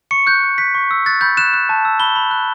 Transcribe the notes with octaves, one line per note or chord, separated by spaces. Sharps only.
C#6 C#7
F#6 G6
F#6
F#6 B6
C#6
E6
F#6 A6
B5 G6
F#6 E7
F#6
A5
E6
B5 G7
B5
F#6